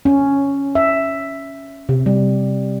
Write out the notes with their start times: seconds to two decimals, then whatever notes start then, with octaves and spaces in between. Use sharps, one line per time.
0.05 C#4
0.75 E5
1.89 C3
2.06 G3